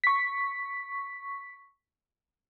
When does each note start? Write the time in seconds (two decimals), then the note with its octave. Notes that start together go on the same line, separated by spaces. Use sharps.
0.04 C#6 B6